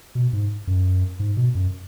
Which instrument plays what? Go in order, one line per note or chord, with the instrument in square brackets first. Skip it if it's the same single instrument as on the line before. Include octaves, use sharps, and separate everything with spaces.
[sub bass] B2
G#2
F#2
G#2
B2
F#2